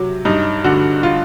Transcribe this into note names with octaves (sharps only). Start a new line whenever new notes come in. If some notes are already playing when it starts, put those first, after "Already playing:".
Already playing: C3 F#3
G2 D#4
D3 F#4
F4